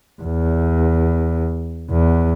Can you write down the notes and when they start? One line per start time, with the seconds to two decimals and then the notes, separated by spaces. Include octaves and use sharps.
0.22 E2
1.90 E2